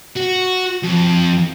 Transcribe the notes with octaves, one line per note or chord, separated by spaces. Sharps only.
F#4
F2